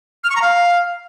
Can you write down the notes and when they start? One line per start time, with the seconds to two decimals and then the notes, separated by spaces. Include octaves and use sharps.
0.24 F6
0.30 C#6
0.36 A#5
0.42 F5